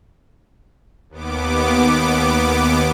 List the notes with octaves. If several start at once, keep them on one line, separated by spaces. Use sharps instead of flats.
D#2 B3 D6